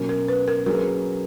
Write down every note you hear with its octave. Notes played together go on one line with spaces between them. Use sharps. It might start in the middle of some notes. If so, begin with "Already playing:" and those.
Already playing: B2 F#3 A#3 C#4
A#4
B4
A#4
F#3 A#3 C#4 G#4 A#4 B4